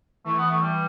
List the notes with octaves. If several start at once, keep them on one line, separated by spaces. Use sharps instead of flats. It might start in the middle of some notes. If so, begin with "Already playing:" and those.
E3 A3
B3
A3
G3